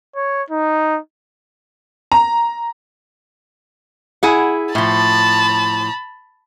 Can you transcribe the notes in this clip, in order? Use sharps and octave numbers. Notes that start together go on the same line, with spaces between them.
C#5
D#4
A#5
E4 G#4 F#5
A2 F3 A5 B5